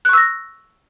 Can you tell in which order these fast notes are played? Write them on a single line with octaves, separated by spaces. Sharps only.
F#6 C#6 E6 A#6